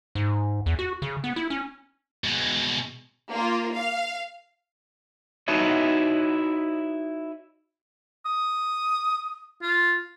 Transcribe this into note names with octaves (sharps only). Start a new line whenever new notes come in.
G#2
E2
F#4
C#3
B3
E4
C#4
B2 G#3
A#3 F4
F5
D#4 E4 F#4 B4 C#5 D#5
D#6
F4